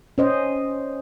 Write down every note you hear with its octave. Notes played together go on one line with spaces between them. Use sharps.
C#4 C5 D#5